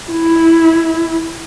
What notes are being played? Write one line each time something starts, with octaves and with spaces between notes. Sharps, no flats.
E4